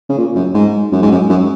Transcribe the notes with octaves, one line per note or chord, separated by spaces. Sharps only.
C#3
A#2
F#2
G#2
F#2
G#2
F#2
F#2